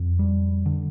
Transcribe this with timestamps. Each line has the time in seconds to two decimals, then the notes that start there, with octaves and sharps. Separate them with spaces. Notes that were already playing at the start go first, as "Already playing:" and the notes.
Already playing: F2
0.19 G3
0.66 D3